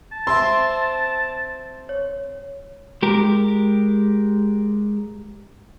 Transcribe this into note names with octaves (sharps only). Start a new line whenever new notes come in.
A5
C4 E5 C6 E6
C#5
G#3 G4 A#4